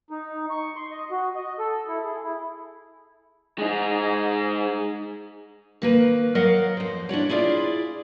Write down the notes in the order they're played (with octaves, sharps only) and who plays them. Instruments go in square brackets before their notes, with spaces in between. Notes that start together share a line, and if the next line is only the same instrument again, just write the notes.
[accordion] D#4
C#6
C6
D#5
F#4
D#5
A4
E4
G#4
E4
[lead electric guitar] G#3 D#4
[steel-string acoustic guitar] D#3 A#3 B4
F#3 A#4 D#5 F5 F#5
F2 C5
D4 E4 F#4 C#5
E4 F4 G#4 A4 D5